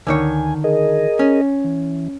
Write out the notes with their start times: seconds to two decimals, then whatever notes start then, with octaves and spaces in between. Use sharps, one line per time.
0.07 D2 D3 D#3 C#5 G#5
0.64 G#4 A#4 D#5
1.19 C#4
1.64 E3